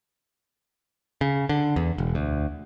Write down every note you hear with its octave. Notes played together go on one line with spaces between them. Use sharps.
C#3
D3
E2
E1
D2